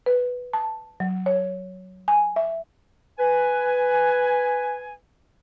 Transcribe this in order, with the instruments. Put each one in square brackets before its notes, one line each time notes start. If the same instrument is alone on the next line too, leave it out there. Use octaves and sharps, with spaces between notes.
[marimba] B4
A5
F#3
C#5
G#5
E5
[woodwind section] B4 G#5